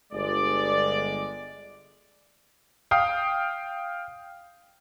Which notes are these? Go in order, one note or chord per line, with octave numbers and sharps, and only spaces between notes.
G1 G#3 D5
F5 G5 D#6